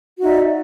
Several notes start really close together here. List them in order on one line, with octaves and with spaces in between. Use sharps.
F#4 D#4 E5 D5